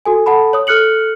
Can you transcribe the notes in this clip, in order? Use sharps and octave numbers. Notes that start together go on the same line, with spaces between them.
F#4 A4 G#5
A4 F#5 A5 B5
C#5 D#6
A4 F6 F#6 C#7 F#7